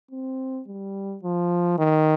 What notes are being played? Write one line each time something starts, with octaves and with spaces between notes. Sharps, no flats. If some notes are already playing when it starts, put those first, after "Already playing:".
C4
G3
F3
D#3